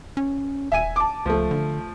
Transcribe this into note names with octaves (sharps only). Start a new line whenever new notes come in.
C#4
D#1 E5 G#5 D#7
A5 D6
C#2 F3 A3
D3